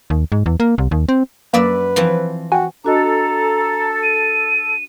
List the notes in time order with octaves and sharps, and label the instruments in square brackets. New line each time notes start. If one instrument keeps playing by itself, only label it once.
[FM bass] D#2
G#2
E2
A#3
C2
D#2
C4
[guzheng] F#2 D5 E5 [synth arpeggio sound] A#3 [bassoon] B4
[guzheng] E3 F3 C4
[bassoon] F#4 [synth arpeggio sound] G5 G#5
[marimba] D4 F#4 D#5 [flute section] A4 [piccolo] A#5
[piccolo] D#7